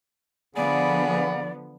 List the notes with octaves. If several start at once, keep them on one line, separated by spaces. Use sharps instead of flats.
D3 F3 B3 G#4 D5 F5 F#5 B5